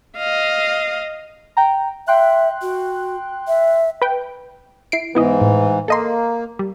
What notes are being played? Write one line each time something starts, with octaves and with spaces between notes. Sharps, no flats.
D#5 F5
G5 A#5
E5 G5 C6 F#6
F#4
E5
B4 G5
E4 C7 D7
G#2 E3 B3 E4 D#5
A2
A#3 A4 D#5 C6
G3